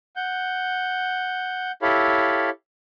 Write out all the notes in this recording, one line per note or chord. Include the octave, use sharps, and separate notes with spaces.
F#5 G6
E4 G4 A4 C#5 F5 B5